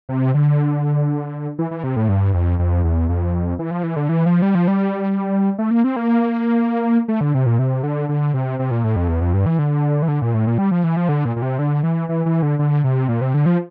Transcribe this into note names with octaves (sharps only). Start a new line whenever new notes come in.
C3
D3
E3
E3
C3
A2
G2
F2
F2
E2
F2
E3
F3
E3
D3
E3
F3
G3
F3
G3
A3
A#3
C4
A#3
A3
D3
C3
A#2
C3
D3
D3
C3
C3
A#2
A2
F2
E2
F2
G2
E3
D3
E3
D3
A#2
A2
A#2
G3
F3
E3
F3
D3
A#2
A#2
C3
D3
E3
E3
E3
D3
D3
C3
A#2
C3
D3
F3